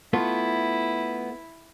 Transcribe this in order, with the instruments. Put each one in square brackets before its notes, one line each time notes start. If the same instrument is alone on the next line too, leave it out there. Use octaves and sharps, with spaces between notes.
[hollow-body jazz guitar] A3 B3 F4 [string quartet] E4